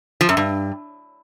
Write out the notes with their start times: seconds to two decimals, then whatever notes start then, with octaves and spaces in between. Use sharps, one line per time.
0.21 F3
0.29 F#2
0.37 G2